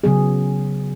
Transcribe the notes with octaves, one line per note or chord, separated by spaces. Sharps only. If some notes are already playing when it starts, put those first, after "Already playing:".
C#3 F#3 B3 G#4